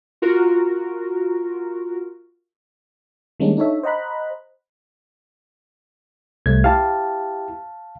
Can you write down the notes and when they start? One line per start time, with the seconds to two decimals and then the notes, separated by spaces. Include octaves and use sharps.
0.22 F4 F#4 A#4
3.40 D#3 G3 G#3 A#3 C#4 D4
3.57 D4 D#4 A4 C#5 E5
3.83 C5 D#5 F#5 A#5 B5 F#6
6.46 C2 A3 G#6
6.64 E4 G4 F5 A5